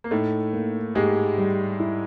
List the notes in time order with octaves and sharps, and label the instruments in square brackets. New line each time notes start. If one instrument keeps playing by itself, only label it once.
[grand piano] A#3
[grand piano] A2 A3 [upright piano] D#4
[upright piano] A#3
[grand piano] G#2 G#3 [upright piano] G4
[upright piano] G3
E4